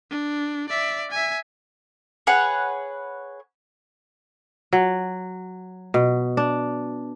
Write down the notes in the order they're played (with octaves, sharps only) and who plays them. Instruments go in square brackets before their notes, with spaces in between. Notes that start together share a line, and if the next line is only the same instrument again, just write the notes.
[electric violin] D4
D5 E5
E5 G#5
[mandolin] G#4 B4 C#5 F#5
[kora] F#3
B2
D4